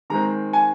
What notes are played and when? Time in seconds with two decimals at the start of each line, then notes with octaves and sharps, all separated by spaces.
0.10 D#3 G#3 C4 A#5
0.53 G#5